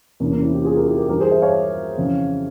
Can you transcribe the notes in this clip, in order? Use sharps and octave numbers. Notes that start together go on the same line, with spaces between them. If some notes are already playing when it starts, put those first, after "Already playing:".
E2 C3 E3 A#3 C#4
A#3 C#4
C4 E4
E4 G4
F4 G#4
G4 A#4
E4 G4
G4 A#4
G2 E3 G4 A#4
G#4 C5
C5 E5
C#5 F5
F2 C#3 E3